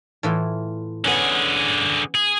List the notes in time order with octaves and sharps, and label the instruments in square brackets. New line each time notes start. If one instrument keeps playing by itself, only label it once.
[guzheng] A2 E3 F4
[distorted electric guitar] D3 G#4 [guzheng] B3 C#4
[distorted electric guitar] G#4